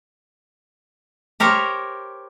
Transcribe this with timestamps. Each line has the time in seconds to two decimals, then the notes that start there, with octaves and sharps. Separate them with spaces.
1.40 G4 A#4 C5 C#5